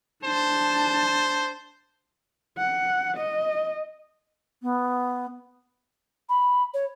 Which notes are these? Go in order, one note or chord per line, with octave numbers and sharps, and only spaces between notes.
D4 C5 A5
F#5
D#5
B3
B5
C#5